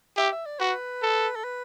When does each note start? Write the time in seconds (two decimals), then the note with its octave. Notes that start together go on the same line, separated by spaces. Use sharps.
0.17 G4 E5
0.32 E5
0.46 D5
0.59 F#4 B4
1.02 A4
1.36 A4
1.44 B4